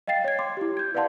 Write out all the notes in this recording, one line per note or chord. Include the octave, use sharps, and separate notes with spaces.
D#5 F5 G5 A6 C7
C#5 G#6
C6 D6
E4 G4
G6 G#6
B4 D5 F5 F#5 A5 C6